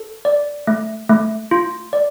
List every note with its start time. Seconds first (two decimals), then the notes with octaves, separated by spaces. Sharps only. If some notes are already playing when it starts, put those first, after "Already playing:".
Already playing: A4
0.25 D5
0.67 A3
1.09 A3
1.51 F4
1.93 D5